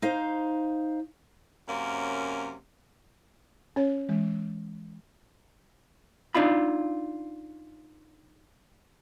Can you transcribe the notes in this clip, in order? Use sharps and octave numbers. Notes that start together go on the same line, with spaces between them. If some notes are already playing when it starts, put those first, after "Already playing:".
D#4 C5 F5
F#2 C3 A#3 C#4
C#4 C#5
E3 G#3
D4 D#4 F4 B5